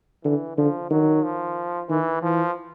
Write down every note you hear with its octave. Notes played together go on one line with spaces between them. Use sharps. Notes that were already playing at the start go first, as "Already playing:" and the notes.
D3 E3
D3 F3
D#3 F#3
F3
D#3 E3
E3 F3